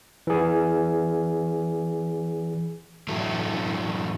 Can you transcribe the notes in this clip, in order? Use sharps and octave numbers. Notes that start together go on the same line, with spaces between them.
E3 G#4
A2 E3 F#3 A3